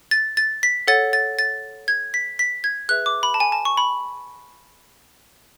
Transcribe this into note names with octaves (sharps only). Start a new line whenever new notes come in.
A6
A6
B6
A4 C#5 F#5 A6
A6
A6
G#6
B6
B6
G#6
G#4 B4 E5 F#6
D6
B5
A5
G#5
A5
C#6
B5